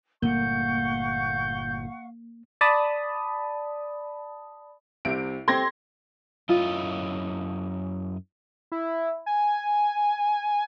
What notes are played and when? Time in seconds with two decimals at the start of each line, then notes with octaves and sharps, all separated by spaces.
0.22 G1 A#2 A3 A#3 F5 F#5 C#6 G6
2.61 D5 A5 B5 D#6
5.05 C2 C3 D7
5.48 C4 G4 A4 C6 G#6 A#6
6.49 F#2 E4 F4 D#5
8.72 E4
9.26 G#5